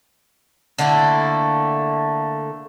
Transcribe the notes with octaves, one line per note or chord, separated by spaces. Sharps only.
D3 A3 A#3 E4